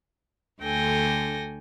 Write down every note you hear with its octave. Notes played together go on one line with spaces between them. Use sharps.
D2 D3 A4 G5 G#5 A#6